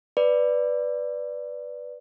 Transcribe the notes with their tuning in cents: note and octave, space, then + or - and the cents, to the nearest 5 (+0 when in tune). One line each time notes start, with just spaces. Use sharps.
B4 +0 D5 +0